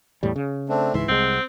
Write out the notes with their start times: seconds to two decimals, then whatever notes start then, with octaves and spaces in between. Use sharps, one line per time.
0.23 E2 A2 G3
0.36 C#3
0.69 A3 C4 D4
0.94 C#2 G#2 E3 E5 C6
1.08 C2 G#3 C4 F#5